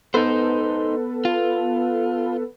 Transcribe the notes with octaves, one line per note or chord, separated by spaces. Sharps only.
B3 D#4 A4 B4 C5
F4